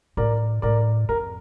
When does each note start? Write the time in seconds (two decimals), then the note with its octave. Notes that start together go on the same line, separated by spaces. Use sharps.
0.17 A2 A#4 D5
0.62 A2 A#4 D5
1.09 F2 A#4